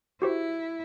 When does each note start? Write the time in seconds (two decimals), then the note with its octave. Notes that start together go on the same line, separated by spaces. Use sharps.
0.22 E4 F#4 G4 C5